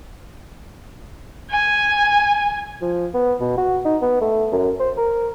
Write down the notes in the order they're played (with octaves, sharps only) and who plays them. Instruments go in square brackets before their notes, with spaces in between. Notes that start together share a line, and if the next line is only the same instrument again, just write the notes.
[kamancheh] G#5
[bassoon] F3
B3
B2
F#4
D#4
B3
A3
F#2
C5
A#4